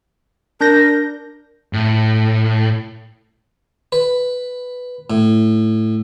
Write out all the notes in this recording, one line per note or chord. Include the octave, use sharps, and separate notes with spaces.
D4 A#4 G6 A#6
A2
B4
A2